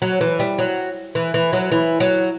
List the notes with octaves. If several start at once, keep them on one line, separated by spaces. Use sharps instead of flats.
F#3
E3
G3
F#3
E3
E3
F#3
E3
F#3